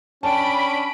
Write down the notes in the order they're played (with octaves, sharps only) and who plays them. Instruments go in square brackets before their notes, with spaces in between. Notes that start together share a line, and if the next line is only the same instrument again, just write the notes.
[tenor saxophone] C#4 [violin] D4 D7 [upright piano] G5 A5 [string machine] B5